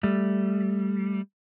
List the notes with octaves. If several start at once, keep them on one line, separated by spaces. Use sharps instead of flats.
G3 A3